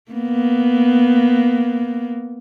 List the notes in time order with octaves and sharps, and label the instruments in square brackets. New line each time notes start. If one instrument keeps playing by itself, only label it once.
[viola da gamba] A#3 B3